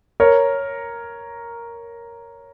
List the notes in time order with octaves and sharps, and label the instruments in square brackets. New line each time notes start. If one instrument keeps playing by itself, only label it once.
[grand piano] A#4 C#5